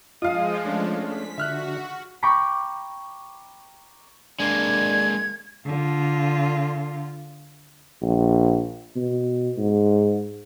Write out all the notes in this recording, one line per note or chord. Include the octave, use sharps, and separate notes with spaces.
F3 G#3 F4 D#5 F5 D#6
A3 C#4 D4
B6
D3 F#4 E5 F6 F#6
G5 A#5 B5 C#6 D6 B6
G#3 A#3 D4 G#6
D3 F4
A#1
B2
G#2